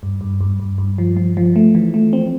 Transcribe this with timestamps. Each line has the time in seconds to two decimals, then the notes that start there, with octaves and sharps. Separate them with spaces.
0.03 G2
0.21 G2
0.41 G2
0.60 G2
0.78 G2
0.98 F3
1.17 F3
1.37 F3
1.56 A3
1.75 E3
1.94 A3
2.13 C4